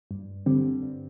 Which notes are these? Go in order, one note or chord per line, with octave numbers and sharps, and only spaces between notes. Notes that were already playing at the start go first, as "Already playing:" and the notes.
G2
D3 G3 C4
G2